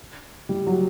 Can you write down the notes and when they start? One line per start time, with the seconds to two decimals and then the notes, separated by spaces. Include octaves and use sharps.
0.49 G3
0.67 F#3